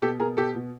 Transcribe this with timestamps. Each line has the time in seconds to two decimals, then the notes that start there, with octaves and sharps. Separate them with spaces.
0.02 B2 G4 A4
0.19 B2 G#4 A#4
0.37 B2 G4 A4
0.55 B2